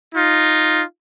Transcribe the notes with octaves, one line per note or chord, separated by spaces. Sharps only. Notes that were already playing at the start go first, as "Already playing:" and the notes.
D#4 F4